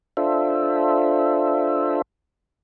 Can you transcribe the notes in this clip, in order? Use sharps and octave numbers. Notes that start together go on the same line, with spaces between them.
D4 F4 A4 C5 E5